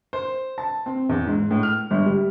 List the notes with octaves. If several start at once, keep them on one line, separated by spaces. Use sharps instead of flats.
C5
A5
C4
E2
G#2
A2
F6
G1
G3